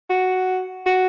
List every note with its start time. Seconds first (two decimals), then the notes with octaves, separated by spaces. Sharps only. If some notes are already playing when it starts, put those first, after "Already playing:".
0.10 F#4
0.86 F#4